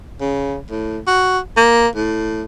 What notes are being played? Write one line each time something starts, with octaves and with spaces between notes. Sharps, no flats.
C#3
A2
F#4
A#3
A2